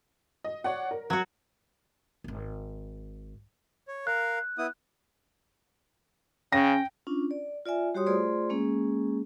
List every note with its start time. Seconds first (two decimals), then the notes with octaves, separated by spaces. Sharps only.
0.44 D#5
0.64 C#5 D5 F#5
0.91 A#4
1.10 F#3 F#4
2.24 D#1 G#1
3.88 C#5
4.07 A#4 F5 F#6
4.58 B3 E4 D#6
6.52 C#3 C#4 G5 A#6
7.07 C#4 D4 F4
7.31 D5
7.65 F4 D5 E5 G#5
7.95 G3 F#4 G4 C#5 C6 D#6
8.06 A3 F4 G#4 C5 D5 C6
8.50 G#3 A#3 C#4 G#4